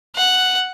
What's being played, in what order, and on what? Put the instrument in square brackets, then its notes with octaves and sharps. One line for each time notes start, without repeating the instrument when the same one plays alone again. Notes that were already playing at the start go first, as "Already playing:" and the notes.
[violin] F#5